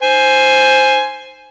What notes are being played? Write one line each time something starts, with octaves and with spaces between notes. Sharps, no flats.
C5 G#5